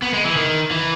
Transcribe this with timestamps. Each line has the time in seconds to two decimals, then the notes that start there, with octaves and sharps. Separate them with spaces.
0.02 B3
0.14 G#3
0.25 E3
0.37 D#3
0.71 E3